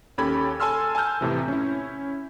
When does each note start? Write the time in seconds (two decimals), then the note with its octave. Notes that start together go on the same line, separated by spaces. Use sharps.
0.18 D#2 C#4 G4 A4 B5 G#6
0.60 A4 G#5 A5 C6 E6 F6
0.95 G#5 A5 E6 F6 G6
1.21 F2 A2 C3 E3
1.48 C#4 E4